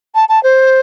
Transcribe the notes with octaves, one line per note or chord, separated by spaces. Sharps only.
A5
A5
C5